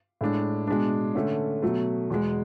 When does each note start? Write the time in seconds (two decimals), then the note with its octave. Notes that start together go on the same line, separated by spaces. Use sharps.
0.21 A2 G#3 D4
0.68 B2 G#3 D4
1.15 D3 A3 C#4
1.63 B2 F#3 A3
2.10 E2 B2 G#3